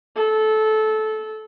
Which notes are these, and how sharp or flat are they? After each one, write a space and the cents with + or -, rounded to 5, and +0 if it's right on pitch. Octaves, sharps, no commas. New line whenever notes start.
A4 -20